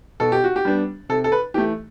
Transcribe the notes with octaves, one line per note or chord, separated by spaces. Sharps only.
B2 A4
G4
F#4
G4
G3 B3 D4
C3 A4
A4
B4
E3 A3 G4